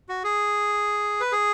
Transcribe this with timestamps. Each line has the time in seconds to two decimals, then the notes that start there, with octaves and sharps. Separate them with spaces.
0.09 F#4
0.24 G#4
1.20 B4
1.32 G#4